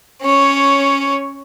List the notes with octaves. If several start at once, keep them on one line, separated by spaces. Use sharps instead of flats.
C#4 C#5